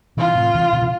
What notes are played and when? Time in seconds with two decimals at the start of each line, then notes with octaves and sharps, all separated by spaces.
0.17 C3 E3 F4
0.35 A2 C3
0.54 C3 E3
0.73 B2 D3
0.82 C3 E3